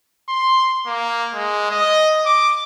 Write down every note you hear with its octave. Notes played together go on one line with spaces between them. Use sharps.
C6
A#3
G#3
D#5
D6